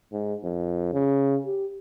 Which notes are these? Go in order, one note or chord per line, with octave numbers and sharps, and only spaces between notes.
G#2
F2
C#3
G4